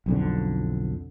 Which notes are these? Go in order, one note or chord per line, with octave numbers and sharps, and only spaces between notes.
B1 F2 D3